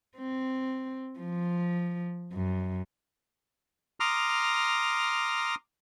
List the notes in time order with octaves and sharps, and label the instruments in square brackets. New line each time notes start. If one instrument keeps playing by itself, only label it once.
[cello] C4
F3
F#2
[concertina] A#5 C6 D6 D#6 F6